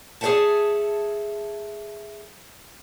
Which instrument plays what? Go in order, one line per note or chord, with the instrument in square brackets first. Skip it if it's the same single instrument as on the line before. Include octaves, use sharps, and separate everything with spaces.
[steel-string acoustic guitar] G#4 A4 C#5 E5 F#5 A5